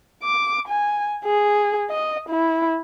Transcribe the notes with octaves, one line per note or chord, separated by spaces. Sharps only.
D6
G#5
G#4
D#5
E4